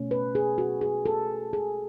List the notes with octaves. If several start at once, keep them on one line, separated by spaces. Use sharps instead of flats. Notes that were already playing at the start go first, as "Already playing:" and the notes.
Already playing: B2 A3 C#4
B4
G#4
F#4
G#4
A4
G#4